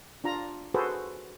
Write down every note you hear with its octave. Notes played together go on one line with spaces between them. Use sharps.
D4 F4 A#5
F#4 G#4 A4 B4 C5